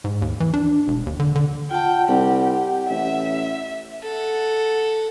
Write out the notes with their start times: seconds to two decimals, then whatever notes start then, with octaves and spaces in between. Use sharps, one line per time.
0.04 G#2
0.22 D#2
0.40 E3
0.54 D4
0.88 E1
1.06 D#2
1.20 D3
1.35 D3
1.71 F4 F#5 G5 A5
2.08 C2 G4 F#5
2.90 A1 E5
4.03 A4 F#5